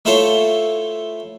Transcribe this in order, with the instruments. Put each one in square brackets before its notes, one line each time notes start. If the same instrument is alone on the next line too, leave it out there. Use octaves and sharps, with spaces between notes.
[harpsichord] A3 E4 F4 A4 C5 C#5